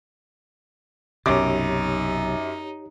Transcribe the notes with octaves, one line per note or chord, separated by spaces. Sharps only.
B1 F#2 C3 D#4 G4 C#5 D6